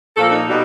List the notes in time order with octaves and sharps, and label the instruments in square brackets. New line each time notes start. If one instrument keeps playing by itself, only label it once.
[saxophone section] A#2 F3 A#3 A4
D#4
B2 G3